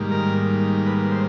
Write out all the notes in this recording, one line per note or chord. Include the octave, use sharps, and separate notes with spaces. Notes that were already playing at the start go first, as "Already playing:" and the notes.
Already playing: G#2 D#3 G3 A#3
A#4
B4
C5